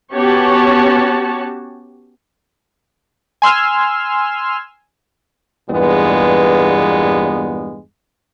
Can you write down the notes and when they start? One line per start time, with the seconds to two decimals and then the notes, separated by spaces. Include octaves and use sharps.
0.14 B3 C#4 F#4 G4 C#5 A5
3.42 G#5 C6 E6 F6
5.69 E2 G2 A#2 G#3 B3